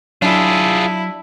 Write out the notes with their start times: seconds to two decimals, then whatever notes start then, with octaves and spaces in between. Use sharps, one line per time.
0.22 F#3 D4 E4 F4 G#4